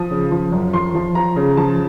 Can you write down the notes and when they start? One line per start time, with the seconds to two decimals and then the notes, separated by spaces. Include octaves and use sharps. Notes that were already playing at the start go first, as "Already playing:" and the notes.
Already playing: F3 D#6
0.11 C#3
0.32 F3
0.52 F#2
0.73 F3 C6
0.94 F3
1.15 F3 A#5
1.36 C#3
1.57 F3 A5